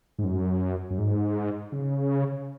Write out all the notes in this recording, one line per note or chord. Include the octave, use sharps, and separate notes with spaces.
G#2
F#2
F#2
G#2
C#3